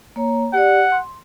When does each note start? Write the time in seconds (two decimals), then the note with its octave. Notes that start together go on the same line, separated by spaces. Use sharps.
0.16 A#3 C#5 A#5
0.53 G4 D5 F#5
0.92 C6